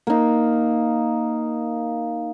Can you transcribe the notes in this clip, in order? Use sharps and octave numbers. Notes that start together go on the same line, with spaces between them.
A#3 D#4